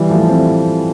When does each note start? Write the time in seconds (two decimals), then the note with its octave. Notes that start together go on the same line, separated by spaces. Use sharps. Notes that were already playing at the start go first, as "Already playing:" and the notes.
Already playing: E3 G3
0.10 F3 A3
0.29 A3 C4